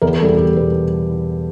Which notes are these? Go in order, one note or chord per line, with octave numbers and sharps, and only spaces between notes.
E2 A#4
B2 G3 A4
E2 G4
B2 G3 B4